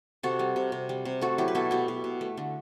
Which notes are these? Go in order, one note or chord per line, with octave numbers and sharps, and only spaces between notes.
C3 F#4 A4
G3
C3
C3
G3
C3
A3 F#4 A4
F#3 E4 G4
B4
B2 F#4 A4
B2 E4 G4
B2
B2
A3
D3